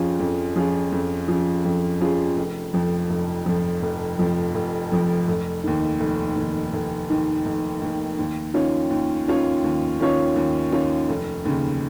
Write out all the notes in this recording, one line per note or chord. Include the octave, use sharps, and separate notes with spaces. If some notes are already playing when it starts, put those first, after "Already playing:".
Already playing: F2 F3 C#4 F4 G#4
F2
F3 C#4 F4 G#4
F2
F3 C#4 F4 G#4
F2
F3 C#4 F4 G#4
F1
F2 F3
F1
F2 F3
F1
F2 F3
F1
F2 F3
F1
D#2 D#3
F1
D#2 D#3
F1
D#2 D#3
F1
D#2 D#3
D#2
D#3 C#4 F4 C#5
D#2
D#3 C#4 F4 C#5
D#2
D#3 C#4 F4 C#5
D#2
D#3 C#4 F4 C#5
F1
D#2 C#3